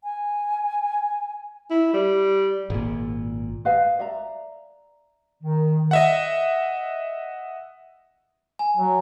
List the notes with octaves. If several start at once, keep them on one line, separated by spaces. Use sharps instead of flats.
G#5
E4
G3
G#1 A#2
B4 D#5 F5
D5 E5 A#5
D#3
D#5 E5 F#5
G#5
F#3